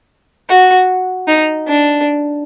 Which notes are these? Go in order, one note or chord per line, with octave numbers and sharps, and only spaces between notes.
F#4
D#4
D4